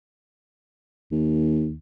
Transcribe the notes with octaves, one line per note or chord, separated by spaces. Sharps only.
D#2